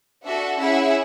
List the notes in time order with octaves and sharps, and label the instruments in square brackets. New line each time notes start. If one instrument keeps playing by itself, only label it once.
[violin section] D4 F#4 A4 E5 F#5
C#4 E4 G#4 E5 F#5